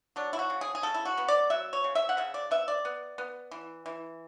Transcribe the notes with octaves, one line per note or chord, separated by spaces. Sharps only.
F#3 D4
E4
F#4
C#3
G#4
G#4
C#3 A4
E4
F#4
B3
D5
F#3 E5
C#5
C#3
E5
F#5
C#3 E5
D5
B3 E5
D5
B3
B3
E3
E3